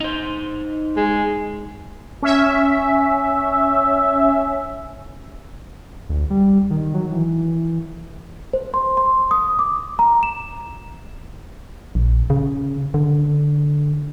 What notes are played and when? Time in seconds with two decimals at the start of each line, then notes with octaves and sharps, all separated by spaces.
0.01 D#4 C5
0.96 G#3
2.22 C#4 E5
6.09 D2
6.30 G3
6.70 D#3
6.94 F#3
7.12 E3
8.53 C5
8.74 C6
8.97 C6
9.31 D#6
9.59 D6
9.99 A#5
10.23 E7
11.95 A#1
12.30 C#3
12.94 D3